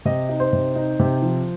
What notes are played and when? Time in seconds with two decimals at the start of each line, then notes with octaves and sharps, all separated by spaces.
0.05 C3 D#5
0.29 D#4
0.40 C5
0.53 C3
0.76 D#4
0.99 C3
1.22 F3